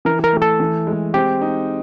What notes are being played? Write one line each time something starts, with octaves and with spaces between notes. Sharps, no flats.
E3 A#4
A#4
A3
A4
E3
G#3
C4 G4
D#4